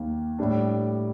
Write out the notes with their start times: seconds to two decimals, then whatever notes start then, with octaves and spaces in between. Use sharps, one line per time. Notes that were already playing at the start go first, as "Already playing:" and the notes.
Already playing: D#2 D#3 A#3
0.39 A2 G3 D4